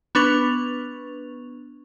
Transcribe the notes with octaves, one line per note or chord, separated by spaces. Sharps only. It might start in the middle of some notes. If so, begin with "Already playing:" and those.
B3 D4 B4 C#6 F7